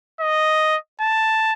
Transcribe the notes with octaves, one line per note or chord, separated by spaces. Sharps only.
D#5
A5